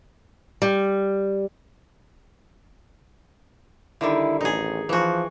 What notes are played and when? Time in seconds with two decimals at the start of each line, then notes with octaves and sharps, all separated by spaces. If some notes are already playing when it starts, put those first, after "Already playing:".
0.62 G3
4.01 D3 D#3 G3 E4
4.41 A1 D#4 G#4
4.89 E3 F3 F#4